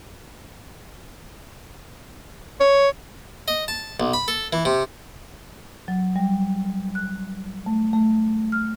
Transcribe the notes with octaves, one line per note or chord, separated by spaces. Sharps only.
C#5
D#5
A5
B1
B5
A4
E3
C3
F#3
G3
F#6
A3
A3
F6